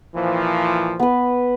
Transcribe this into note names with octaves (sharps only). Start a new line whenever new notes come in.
A#2 E3 F3
B3 B4